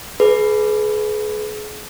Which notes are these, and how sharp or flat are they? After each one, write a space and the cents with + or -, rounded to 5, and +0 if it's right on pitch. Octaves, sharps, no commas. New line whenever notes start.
G#4 +35 B4 +0